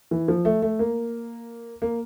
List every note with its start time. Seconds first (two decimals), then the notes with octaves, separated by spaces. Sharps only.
0.11 E3
0.28 F3
0.45 A3
0.62 A3
0.79 A#3
1.82 A#3